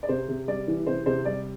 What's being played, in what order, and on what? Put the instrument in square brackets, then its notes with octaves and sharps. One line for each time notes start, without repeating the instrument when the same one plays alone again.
[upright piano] D5
C3 C5
C3
G3 D5
E3
C3 C5
C3 C5
G3 D5